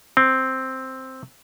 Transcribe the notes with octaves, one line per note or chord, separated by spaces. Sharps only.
C4